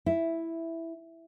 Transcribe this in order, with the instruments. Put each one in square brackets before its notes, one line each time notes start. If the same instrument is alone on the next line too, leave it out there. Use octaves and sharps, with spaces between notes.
[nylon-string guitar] E4